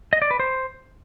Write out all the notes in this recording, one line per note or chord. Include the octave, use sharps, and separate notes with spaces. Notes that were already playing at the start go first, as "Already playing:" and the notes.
D#5
D5
B4
C5